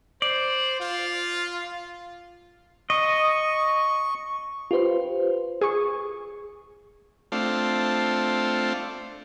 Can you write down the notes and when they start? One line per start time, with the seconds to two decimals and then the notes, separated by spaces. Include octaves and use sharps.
0.22 C5 D5
0.80 F4
2.90 D#5 C#6
4.71 F4 G4 B4 C5
5.61 G#4 C#6
7.32 A3 C4 D4 F4